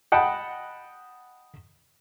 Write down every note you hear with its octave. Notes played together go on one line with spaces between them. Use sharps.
D#5 F#5 G5 A5 B5